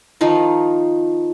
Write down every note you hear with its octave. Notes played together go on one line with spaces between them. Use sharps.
D#3 F3 D#4 F4